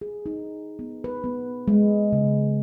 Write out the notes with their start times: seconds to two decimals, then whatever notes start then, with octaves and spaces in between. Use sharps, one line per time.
0.01 G#4
0.26 D#4
0.79 B3
1.04 B4
1.24 B3
1.68 G#3
2.12 C#3